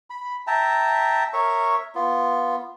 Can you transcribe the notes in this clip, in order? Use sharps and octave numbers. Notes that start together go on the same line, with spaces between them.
B5
E5 G5 A5 A#5
A#4 C#5 E5 C#6
B3 F4